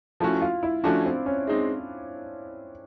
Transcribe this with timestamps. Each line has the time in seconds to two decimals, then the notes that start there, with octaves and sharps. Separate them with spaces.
0.20 F3 A3 C#4 E4 F#4
0.42 F4
0.63 E4
0.84 F3 A3 C#4 D4 F#4
1.06 C4
1.26 C#4
1.47 G#3 C4 D#4